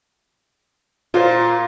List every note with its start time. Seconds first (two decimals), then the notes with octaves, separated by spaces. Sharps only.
1.14 A#2 F4 C5